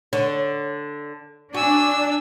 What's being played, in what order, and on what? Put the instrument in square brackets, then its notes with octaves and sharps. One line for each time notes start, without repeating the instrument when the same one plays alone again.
[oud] D3 C#5
[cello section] D4 [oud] F#4 [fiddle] G#5 E6